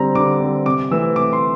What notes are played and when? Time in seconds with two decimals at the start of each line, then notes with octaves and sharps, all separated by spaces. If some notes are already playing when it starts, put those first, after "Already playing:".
Already playing: D3 G3 C4 A#5
0.15 D3 D6
0.40 G3 C4
0.66 C3 D6
0.91 E3 A3 C4 E6
1.16 C3 D6
1.33 C6